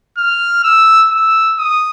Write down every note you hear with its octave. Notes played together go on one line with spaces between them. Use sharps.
F6
E6
E6
D#6